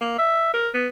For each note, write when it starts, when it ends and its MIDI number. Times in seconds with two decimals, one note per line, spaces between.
0.01 0.18 58
0.19 0.49 76
0.54 0.69 70
0.74 0.88 59